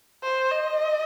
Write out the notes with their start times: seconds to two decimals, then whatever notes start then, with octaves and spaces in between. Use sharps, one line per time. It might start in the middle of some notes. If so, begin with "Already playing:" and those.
0.23 C5
0.51 D#5